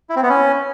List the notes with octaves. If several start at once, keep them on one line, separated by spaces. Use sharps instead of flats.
E4
C4
B3
C#4